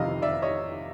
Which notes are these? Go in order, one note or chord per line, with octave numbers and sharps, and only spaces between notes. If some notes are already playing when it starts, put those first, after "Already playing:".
Already playing: F1 F2 C3 D#3 D#5 F5
F1 D5 E5
C#5 D#5